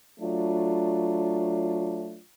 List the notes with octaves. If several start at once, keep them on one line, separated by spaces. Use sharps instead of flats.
F#3 A3 D4 F4